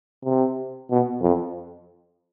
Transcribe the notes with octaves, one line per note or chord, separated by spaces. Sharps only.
C3
B2
F2